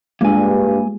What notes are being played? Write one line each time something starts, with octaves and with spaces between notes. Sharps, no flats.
G2 G3 G#3 A#3 F4 G#5